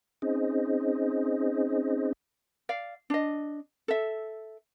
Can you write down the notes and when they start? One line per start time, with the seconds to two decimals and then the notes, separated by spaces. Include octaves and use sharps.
0.22 C4 C#4 D#4 G#4 C5 D#5
2.69 D5 F5
3.10 D4 D#5
3.88 A4 E5